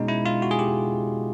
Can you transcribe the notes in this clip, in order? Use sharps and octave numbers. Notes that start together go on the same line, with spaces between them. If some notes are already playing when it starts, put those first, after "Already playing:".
Already playing: B2 G#3 C#4 D#4
E4
F4
F#4
G#4
G4